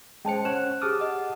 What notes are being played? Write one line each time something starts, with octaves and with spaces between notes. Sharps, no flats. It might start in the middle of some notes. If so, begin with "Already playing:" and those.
G#3 C#4 C5 G5 A5 C#7
C#4 C#5 F#5 F#6 E7
G4 G#4 A5 D6 D#6 F6
D#5 F#5